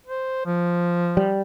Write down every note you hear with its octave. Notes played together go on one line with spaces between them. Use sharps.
C5
F3
G3